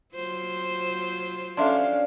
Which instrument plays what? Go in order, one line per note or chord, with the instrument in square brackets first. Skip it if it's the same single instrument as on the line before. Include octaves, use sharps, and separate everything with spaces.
[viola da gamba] F#3 F4 C5
[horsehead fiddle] C#4 F5 [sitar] D4 [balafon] A4 E5 C6